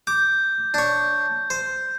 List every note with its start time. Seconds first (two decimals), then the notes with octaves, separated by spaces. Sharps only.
0.07 D6 G6
0.74 D4 C#5
1.50 C5